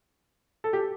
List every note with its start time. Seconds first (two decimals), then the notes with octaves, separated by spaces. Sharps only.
0.64 A4
0.73 G4